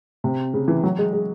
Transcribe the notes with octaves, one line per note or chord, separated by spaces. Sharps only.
C3
C#3
E3
F#3
G#3
G#3